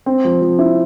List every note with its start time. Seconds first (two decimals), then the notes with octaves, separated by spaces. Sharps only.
0.06 C4
0.25 F3
0.41 F3
0.59 E4